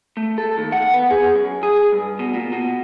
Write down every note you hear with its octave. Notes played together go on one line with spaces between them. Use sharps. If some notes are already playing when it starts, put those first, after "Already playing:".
A3
A4
D#2
F#5
B3
G#4
F#2
G#4
G2
B2
A#2
B2